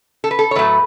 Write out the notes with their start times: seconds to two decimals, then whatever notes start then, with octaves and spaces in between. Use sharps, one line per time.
0.24 A4
0.31 B4
0.39 A4
0.51 C#5
0.56 A2 F#3 A3 B4